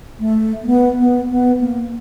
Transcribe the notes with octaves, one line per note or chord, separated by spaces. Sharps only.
A3
A#3
B3
B3
B3
A#3